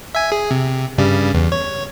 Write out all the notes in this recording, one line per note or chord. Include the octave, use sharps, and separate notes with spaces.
E5 G#5
G#4
C3
G2 C#3 G3
E2
C#5